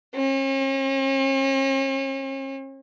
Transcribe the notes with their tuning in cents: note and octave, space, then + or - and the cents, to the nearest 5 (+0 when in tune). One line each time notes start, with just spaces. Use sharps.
C#4 -45